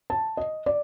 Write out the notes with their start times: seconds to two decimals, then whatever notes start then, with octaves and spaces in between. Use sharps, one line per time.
0.10 A5
0.37 D#5
0.66 D5